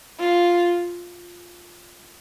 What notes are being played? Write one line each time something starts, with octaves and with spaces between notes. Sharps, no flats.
F4